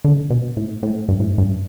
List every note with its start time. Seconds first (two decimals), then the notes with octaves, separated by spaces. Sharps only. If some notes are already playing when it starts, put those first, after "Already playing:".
0.05 D3
0.30 B2
0.57 A2
0.83 A2
1.08 G2
1.20 A2
1.26 G2
1.38 G2